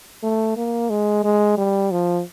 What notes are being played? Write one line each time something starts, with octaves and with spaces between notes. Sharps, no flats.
A3
A#3
G#3
G#3
G3
F3